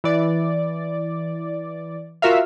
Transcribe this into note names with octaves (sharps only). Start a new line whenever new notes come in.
E3 D5
F4 F#4 A#4 E5 F5